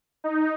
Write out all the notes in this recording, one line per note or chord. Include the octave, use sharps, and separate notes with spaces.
D#4